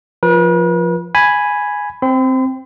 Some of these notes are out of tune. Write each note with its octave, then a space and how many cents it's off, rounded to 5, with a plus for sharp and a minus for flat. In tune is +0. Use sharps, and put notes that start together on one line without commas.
F3 +0 B4 -40
G#5 +0 B5 +0
C4 +0 C6 -45